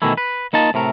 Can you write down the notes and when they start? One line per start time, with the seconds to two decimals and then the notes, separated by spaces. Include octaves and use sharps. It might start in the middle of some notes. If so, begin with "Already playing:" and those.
0.02 B2 D#3 E3 A3 E4
0.17 B4
0.53 A#3 D#4 F4 A5
0.74 A2 C3 A3 A#4